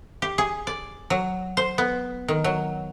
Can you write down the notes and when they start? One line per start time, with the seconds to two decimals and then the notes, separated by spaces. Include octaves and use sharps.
0.22 G4
0.38 G#4
0.67 D5
1.10 F#3
1.57 C5
1.78 B3
2.28 D#3
2.44 F#3